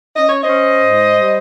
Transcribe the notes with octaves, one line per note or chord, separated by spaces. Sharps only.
C#4 D#5
C#5
C5 D#5
C#4
G#2
G3